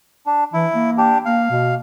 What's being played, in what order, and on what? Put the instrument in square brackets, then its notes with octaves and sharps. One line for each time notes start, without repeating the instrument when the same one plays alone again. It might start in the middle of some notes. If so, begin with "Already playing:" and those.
[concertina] D4
[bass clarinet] E3 [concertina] E4
[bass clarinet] A#3
[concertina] D4 G4
[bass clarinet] A#3 [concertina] F5
[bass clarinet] B2